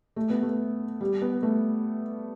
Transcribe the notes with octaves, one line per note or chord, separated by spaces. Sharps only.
A3
B3
A3
G3
B3
A3